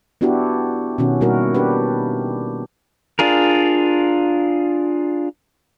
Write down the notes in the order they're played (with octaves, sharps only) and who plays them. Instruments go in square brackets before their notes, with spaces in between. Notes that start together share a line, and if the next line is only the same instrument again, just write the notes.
[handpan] B3 D4 E4 F#4 G4
B2 D#3 C#4 F#4
B2 G3 A#3 E4 F#4 A#4
D4 G4 B4
[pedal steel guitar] D4 F4 G#4 A#4